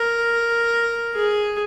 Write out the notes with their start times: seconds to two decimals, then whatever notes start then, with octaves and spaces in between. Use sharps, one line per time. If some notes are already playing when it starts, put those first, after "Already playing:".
Already playing: A#4
1.15 G#4